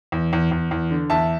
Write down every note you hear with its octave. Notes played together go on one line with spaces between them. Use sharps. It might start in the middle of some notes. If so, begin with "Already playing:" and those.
E2
E2
E2
E2
D3
E2 E5 A5